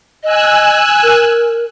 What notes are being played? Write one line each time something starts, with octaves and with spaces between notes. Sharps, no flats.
D#5 G#5 E6 F#6
A#4